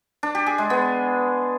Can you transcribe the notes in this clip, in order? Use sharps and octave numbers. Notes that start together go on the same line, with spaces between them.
D4
G4
G#4
G#3
B3